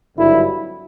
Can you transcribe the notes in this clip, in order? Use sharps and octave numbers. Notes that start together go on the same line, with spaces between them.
G#1 G2 D3 F#3 E4